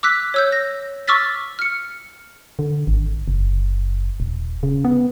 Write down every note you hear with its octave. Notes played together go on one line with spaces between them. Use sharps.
D6 E6 F#6 B6
C#5 E6 G6
A#6
C#6 D6 E6 F6 A6 B6
F6 C#7
D3
G#1
F#1
D#1
C#3
B3